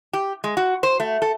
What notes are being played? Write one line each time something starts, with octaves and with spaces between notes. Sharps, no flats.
G4
G#3
F#4
C5
A3
A4